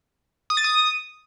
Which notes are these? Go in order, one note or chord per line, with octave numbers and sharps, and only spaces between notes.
D#6
A6
D#6